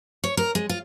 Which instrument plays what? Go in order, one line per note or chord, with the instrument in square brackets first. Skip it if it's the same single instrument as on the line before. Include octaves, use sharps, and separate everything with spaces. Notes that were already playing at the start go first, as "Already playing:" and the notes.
[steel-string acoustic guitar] C#5
A#4
G#3
F4